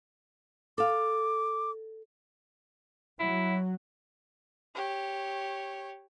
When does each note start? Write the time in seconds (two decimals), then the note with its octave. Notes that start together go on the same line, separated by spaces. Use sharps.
0.78 A4 F5 D6
3.19 F#3 E4
4.75 G4 C#5